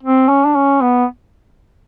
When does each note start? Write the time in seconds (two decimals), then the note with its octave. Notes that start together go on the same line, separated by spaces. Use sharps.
0.03 C4
0.29 C#4
0.44 D4
0.55 C#4
0.81 B3